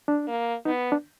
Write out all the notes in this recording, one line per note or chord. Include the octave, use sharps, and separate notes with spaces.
D4
A#3
B3 D#4
D4